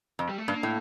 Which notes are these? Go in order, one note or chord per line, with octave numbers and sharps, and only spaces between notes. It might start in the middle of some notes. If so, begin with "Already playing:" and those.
F2
G3
A3
G2 A#3
A2